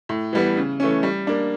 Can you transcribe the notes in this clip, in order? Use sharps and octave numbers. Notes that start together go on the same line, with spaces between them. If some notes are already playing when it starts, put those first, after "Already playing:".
A2
E3 G3 B3
C#3
E3 A3 C#4
G3
A#3 D4